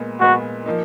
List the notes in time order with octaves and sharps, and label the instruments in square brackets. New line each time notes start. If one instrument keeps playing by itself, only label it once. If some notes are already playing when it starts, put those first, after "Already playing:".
Already playing: [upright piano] A#2 G#3 B3
[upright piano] A#2 G#3 B3 [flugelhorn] F#4
[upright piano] F3 A#3 D#4